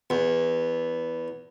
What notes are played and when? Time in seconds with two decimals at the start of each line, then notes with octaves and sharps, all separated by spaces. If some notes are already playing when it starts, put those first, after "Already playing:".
0.10 E2